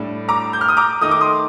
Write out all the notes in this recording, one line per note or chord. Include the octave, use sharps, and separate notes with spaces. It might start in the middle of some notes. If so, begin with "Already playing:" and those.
Already playing: A2 G3 D4
A#5 D6
G6
F6
D#6
A#5 D6
D#3 A3 D#4 D#6
D6
C6 D#6